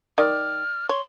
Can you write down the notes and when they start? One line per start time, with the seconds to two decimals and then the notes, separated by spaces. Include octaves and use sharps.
0.18 D#3 D5 F6
0.89 C#5 C6